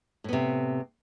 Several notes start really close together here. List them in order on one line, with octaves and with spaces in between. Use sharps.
A2 B3 C3